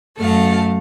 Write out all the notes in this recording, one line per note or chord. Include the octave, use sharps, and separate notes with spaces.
F#2 A3 A4 F5